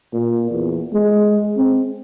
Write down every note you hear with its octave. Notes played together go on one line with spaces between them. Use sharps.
A#2
E2
G#3
C4